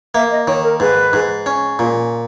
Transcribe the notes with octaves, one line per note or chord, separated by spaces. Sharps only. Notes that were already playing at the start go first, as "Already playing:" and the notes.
A#3 E5
D#5
D#3 C#5
A#4
G#2 B4
G#2
C#4
A#2